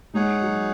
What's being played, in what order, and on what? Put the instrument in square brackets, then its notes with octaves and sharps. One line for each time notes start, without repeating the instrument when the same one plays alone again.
[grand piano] G#3 [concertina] D#4 G#4 C#5 F#5
[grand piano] F#3